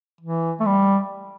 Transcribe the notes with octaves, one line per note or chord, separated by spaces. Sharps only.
E3
A3
G3